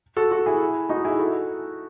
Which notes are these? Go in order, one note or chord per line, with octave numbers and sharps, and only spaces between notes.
F#4 A4
F#4 A4
E4 G#4
D#4 F#4
E4 G#4
F#4 A4